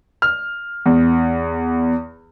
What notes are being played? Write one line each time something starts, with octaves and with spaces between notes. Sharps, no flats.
F6
E2